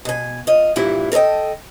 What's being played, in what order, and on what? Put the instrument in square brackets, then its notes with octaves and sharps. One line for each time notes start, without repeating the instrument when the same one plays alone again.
[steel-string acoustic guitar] B2 G#5
F4 D#5
G2 A#2 E3 F3 G3 E4
A4 A#4 C#5 D#5 G5